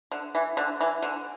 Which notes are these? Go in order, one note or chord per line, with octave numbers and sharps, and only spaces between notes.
D3
E3
D3
E3
D3